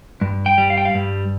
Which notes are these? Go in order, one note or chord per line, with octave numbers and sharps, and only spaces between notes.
G2
G5
G3
F5
G5
F5
G2